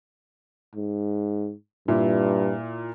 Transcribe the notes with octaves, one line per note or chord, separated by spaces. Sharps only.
G#2
G2 A#2 E4